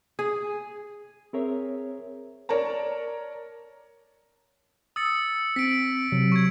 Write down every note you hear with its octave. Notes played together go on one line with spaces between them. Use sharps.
G#4
C4 G#4 A#4 C#5 E5
A#4 C#5 D5 A5 A#5
D#6 E6 A6 C#7
C4 B6 D7
C3 F#3
C#6 G#6